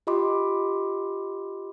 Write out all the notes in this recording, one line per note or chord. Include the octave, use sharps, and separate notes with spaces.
F4 G4 D#5 B5 C6 D6